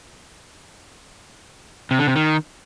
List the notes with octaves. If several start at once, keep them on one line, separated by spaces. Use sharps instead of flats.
C3
D3
C3
D#3